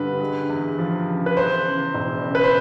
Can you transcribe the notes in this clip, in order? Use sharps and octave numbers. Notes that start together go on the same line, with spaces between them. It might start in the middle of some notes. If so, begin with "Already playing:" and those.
Already playing: G2 D3 B4
G#3
E2
F3
C#3
B4
E2 C5
C#3
E1
C#3
B4
C5